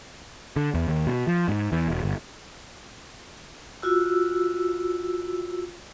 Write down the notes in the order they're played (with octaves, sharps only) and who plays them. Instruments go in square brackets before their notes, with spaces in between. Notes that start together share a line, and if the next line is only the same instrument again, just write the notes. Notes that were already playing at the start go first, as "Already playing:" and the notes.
[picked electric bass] D3
E2
D#2
B2
F3
G#2
E2
E1
G1
[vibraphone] F4 F#4 E6